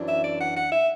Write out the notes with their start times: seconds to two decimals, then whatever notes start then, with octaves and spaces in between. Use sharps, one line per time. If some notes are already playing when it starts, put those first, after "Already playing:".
Already playing: F#2 E3 D4
0.09 E5
0.24 D5
0.40 F#5
0.57 F#5
0.72 E5